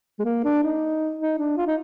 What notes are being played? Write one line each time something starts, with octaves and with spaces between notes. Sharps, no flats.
G#3
A#3
D4
D#4
D#4
D4
F4
D#4